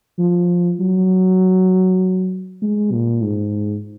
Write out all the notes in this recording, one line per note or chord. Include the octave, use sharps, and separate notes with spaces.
F3
F#3
G#3
A#2
G#2